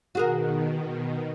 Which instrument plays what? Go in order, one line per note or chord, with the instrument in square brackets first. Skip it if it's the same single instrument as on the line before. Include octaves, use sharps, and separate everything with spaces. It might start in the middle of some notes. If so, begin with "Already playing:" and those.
[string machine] B2 D#3 [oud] F#4 G#4 A#4